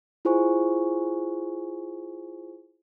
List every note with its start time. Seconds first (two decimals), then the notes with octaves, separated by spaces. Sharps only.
0.25 E4 F4 G#4 C5 G#5 C#6